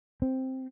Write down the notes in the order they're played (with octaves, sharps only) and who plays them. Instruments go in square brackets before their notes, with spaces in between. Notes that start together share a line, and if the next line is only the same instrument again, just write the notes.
[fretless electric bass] C4